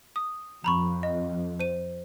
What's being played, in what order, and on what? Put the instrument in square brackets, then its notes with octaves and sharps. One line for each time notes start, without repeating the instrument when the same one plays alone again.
[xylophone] D#6
[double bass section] F2 [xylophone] A#5 B5 C#6
[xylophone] D#5
C5 D#7